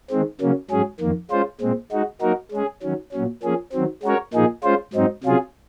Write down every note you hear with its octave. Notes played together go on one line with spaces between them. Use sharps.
D#3 G#3 C4
C#3 F#3 A#3 C#4
G#2 F#3 C#4 G#4
F2 D#3 A#3
G#3 C#4 F4 C5
A#2 G#3 C4
G#3 D#4 F#4
F#3 A#3 D#4 F#4 A#4
G#3 C#4 G#4
D#3 F#3 C#4
A#2 F#3 C#4
F3 A#3 C#4 G#4
D#3 F#3 C4
G#3 C#4 F#4 A#4 C#5
A#2 F3 A#3 D#4 G#4
G#3 C#4 F4 C5
G#2 F#3 C4 D#4
C3 F#3 C#4 F4 G#4